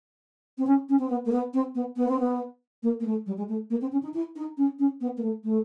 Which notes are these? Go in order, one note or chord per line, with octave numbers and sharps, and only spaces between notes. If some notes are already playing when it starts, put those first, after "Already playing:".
C4
C#4
C#4
C4
B3
A#3
B3
C4
B3
B3
C4
B3
A#3
A#3
A3
G3
G#3
A3
A#3
C4
C#4
D#4
E4
D#4
C#4
C#4
B3
A#3
A3
A3